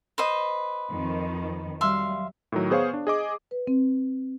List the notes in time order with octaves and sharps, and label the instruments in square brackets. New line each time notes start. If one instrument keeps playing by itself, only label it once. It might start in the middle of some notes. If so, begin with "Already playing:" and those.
[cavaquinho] B4 C5 D#5
[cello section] F2 D#3
[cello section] F#3 G3 [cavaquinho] E5 F5 C6
[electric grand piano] A2 D#3 F#3
B3 G#4 C5 C#5 F5 C#6
D4
G#4 D#5 D6
[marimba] B4
C4